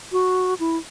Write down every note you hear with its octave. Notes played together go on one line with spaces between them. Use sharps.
F#4
E4